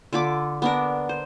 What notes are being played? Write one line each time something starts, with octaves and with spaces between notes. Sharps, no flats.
D3 F4 B5 D6
B3 D4 A#4
C5